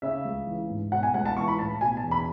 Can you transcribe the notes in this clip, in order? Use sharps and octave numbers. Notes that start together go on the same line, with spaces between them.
C#3 E5
C#2
E3
G#2
B2 F#5
G#5
C#2 F#5
A5
E3 C#6
B5
A2 A5
B2 G#5
A5
E2
B5